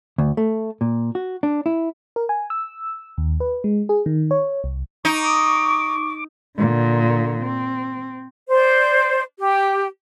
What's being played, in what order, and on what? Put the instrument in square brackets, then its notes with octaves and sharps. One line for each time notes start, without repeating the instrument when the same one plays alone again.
[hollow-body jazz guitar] D2
A3
A#2
F#4
D4
E4
[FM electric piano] A#4
G#5
E6
D#2
B4
G#3
G#4
D#3
C#5
C2
[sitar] D#4 [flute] C#6 [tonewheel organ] D6
[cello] A#2 D3
C4
[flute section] C5 D5
G4